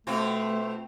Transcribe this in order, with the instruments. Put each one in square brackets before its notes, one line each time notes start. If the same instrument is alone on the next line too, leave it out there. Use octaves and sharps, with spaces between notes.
[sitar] B2 C4 F4 [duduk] A3